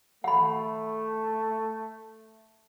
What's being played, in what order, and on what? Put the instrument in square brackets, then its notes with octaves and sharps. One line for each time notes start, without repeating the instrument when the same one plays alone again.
[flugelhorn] A3 [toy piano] F#5 B5